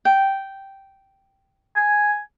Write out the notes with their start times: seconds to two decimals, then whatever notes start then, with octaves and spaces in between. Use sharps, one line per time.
0.05 G5
1.76 G#5